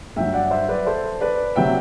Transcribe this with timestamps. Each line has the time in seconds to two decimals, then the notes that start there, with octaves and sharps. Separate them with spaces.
0.16 G2 F#3 E5 G5
0.34 D5 F#5
0.51 C5 E5
0.69 B4 D5
0.87 A4 C5
1.21 B4 D5
1.56 C3 F#3 E5 G5